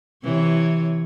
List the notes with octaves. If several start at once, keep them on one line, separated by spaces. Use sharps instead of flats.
C3 E3 C#5